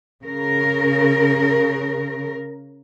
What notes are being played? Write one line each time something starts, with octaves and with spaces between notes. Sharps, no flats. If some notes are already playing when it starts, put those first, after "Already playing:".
C#3 A#4